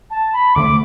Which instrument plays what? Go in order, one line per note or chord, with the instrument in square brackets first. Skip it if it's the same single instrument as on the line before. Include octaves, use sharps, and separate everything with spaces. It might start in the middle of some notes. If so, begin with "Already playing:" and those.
[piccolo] A5
B5
[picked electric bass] D2 D3 A3 [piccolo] D6